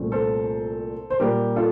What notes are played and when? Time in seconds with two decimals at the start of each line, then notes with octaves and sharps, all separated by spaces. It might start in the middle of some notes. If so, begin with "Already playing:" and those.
Already playing: C2 A#2 A3 C4
0.12 A4 C5
1.10 C5
1.20 A#2 G3 A#3 G4 A#4
1.56 F4 A4